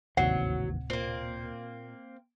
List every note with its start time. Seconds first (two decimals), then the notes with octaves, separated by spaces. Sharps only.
0.17 D1 G#1 D#2 C3 E3 F#3 F#5
0.90 A#2 A#3 C4